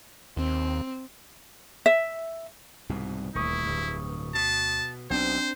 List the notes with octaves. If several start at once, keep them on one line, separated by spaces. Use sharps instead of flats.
D#2 C4
E5
C2 G#2 B2
D#1 D2 E4 C#6 D#6
D1 G2
B2 A5
B1 B2 C4 D4 C5